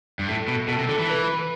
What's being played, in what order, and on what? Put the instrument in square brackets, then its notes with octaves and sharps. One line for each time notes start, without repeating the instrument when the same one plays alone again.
[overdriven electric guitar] G2
[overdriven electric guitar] A2 [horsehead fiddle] A4
[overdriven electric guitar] B2
[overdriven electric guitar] B2 [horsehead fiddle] A4
[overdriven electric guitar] C3
D3
E3
[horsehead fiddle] B4